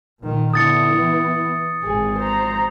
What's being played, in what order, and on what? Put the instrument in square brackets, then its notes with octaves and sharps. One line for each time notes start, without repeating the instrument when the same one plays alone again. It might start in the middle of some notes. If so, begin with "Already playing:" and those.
[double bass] A#2 D#3
[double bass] D3 [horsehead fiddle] B3 E4 [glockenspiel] D#6 A6 C#7
[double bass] E3
[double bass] G#1 [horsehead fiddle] G#4
[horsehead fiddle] C5 A#5